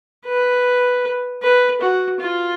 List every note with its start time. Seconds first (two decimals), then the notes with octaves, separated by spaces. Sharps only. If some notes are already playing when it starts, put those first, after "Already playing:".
0.26 B4
1.42 B4
1.81 F#4
2.20 F4